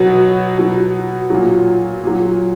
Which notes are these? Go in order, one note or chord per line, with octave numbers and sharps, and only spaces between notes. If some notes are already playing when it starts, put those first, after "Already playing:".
Already playing: B2 F#3 B3
B2 F#3
A#2 F#3
A#2 F#3